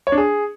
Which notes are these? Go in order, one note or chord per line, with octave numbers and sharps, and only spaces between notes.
C#5
D4
G#4